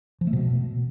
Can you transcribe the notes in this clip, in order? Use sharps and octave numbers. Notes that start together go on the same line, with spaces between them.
F3
A3
B2